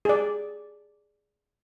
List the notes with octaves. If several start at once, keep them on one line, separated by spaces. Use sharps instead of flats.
G#4 D5